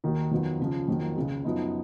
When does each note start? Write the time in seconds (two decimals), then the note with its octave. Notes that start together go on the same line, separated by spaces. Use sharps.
0.04 D#2 D#3 A#3 D#4 F#4
0.31 F2 D#3 F#3 B3 F4
0.60 C#2 C#3 F3
0.88 F2 D#3 F#3 A#3
1.17 C#2 C#3 G#3
1.45 F#2 F3 B3 D#4